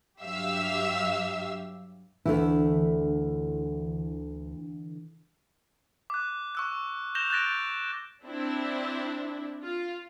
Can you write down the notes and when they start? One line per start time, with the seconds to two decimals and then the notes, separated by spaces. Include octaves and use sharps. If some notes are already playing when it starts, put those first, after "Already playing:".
0.21 G2 F#3 G4 E5 F5 E6
2.26 D2 D3 E3 A3 E4
6.10 D6 F#6
6.55 C#6 E6 F#6
7.15 G6 A#6 E7 F7 G7
7.30 F#6 G6 A6 A#6 D7
8.24 C4 D4 E4
9.64 F4